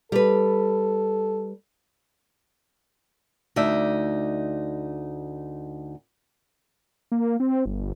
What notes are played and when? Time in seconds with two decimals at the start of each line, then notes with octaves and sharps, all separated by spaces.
0.12 G3 A4 B4
3.56 D2 D#4 D5 E5
7.12 A#3
7.40 C4
7.66 G1